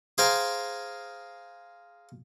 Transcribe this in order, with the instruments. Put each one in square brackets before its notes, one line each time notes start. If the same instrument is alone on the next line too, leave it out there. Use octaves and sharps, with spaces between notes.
[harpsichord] G#4 C5 F5 G5 A#5